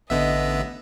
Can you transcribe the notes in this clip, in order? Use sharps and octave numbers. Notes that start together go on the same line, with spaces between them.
A1 D3 B3 D#5 E5